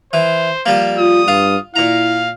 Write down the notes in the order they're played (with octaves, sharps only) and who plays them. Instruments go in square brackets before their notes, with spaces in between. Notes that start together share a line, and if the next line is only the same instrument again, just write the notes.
[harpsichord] E3 [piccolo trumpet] C5
[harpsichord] F3 G3 A#3
[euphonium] F4 [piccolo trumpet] D#6
[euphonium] G2 [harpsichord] F4
[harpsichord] A#2 A#5 [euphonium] E4 [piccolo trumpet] F5